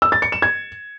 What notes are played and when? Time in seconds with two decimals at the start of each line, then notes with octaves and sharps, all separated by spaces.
0.02 E6
0.12 A6
0.22 C#7
0.32 E7
0.42 G#6